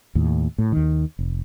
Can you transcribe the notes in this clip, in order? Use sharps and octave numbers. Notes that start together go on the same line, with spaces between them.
D#2 A2
A2
D#2 D#3
F1